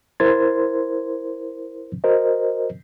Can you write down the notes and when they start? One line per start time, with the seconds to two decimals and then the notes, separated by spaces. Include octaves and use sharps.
0.20 E4 A#4 C5 C6 G#6 A6
2.04 F#4 A#4 C5 D#5